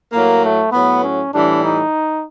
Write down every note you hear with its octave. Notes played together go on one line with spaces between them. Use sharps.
A2 F#3 A#3
A3
A2 F#3 B3
C#4
A2 E3 G3 D4
D#4